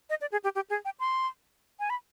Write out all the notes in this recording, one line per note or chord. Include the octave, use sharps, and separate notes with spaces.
D#5
D5
G#4
G4
G4
G#4
G5
C6
G#5
B5